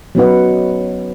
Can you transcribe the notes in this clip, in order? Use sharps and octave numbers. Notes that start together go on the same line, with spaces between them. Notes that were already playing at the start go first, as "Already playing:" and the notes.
F#3 B3 C#4 D#4 B4 F#5